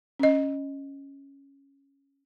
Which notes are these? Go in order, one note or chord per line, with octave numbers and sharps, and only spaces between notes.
C#4 D#5